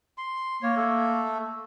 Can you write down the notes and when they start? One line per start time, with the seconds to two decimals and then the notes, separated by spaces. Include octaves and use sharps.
0.18 C6
0.62 A#3 C#5
0.77 A3 A4